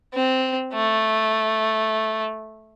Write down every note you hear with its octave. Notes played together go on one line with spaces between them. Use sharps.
C4
A3